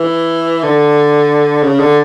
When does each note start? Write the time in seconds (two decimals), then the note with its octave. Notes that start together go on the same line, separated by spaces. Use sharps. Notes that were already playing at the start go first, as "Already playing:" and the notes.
Already playing: E3
0.63 D3
1.63 C#3
1.79 D3